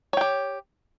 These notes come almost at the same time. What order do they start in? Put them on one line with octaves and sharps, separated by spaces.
C#5 G5 G4